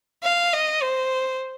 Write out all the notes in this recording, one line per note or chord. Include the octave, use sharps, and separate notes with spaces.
F5
D#5
C5